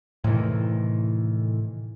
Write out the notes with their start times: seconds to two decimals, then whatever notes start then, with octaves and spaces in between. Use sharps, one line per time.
0.24 A2 C3 D#3 E3